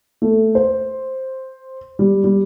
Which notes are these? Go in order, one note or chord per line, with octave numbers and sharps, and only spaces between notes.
A3
C5
G3
G3